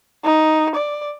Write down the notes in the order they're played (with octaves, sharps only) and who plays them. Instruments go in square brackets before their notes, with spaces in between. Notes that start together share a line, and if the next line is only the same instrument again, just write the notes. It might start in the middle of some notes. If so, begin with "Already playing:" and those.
[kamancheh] D#4
D5